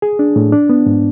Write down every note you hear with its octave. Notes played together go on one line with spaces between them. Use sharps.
G#4
D4
A2
D4
B3
G#2